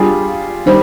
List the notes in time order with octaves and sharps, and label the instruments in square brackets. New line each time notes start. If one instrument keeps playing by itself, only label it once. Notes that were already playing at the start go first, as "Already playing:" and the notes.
Already playing: [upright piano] G3 D4 F4 G#4
[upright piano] D#3 G3 [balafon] C5